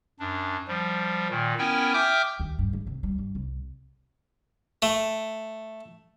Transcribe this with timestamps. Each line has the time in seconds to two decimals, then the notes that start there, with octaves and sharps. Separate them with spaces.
0.19 F#2 D4
0.68 F3 G3
1.30 A#2 D#3
1.58 B3 C#4 E4 A#4 G5 G#5
1.94 E5 G5 D6 D#6 F6 G6
2.39 D#2
2.58 G2
2.73 G#3
2.87 C3
3.03 G3
3.18 G2
3.35 C2
4.82 A3